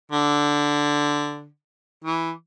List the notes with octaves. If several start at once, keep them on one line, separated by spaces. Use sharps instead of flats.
D3
E3